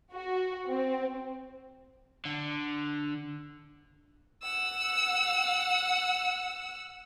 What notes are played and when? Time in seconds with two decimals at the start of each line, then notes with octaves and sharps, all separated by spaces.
0.12 F#4
0.67 C4
2.25 D3
4.43 F#5 E6